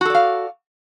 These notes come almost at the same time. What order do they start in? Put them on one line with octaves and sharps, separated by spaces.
F#4 A4 D5 F5